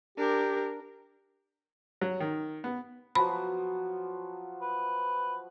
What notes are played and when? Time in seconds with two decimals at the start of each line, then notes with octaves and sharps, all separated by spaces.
0.18 D4 G4 A#4
2.02 F#3
2.20 D#3
2.64 B3
3.15 F3 F#3 B3 B5
4.62 B4